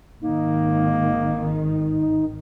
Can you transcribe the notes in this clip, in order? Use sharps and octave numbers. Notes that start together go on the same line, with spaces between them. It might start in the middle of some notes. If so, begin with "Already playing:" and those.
G#1 D#3 A#3 D#4